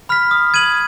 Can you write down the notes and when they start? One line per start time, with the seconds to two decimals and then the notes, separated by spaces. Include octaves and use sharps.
0.09 B5 F6 B6
0.31 D#6
0.54 G#6 D#7 F#7